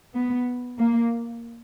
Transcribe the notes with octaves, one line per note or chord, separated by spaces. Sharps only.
B3
A#3